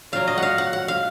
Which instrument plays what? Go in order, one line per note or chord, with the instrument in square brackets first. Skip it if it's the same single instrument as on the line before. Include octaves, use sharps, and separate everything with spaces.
[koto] A#2 F#3 F5
D#5
F5 F#5
F#5
F#5
F5